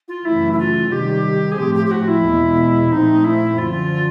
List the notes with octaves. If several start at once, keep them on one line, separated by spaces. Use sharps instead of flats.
F4
F#2 C#3 E3 A3 E4
E4
F4
C3 D#3 G3 G4
G#4
A2 F3 A3 C4 G4
G4
G4
F#4
E4
E2 B2 G#3
A#2 F3 A3 C4 D#4
E4
F#2 D3 F3 F4